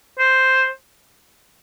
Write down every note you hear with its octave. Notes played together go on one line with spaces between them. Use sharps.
C5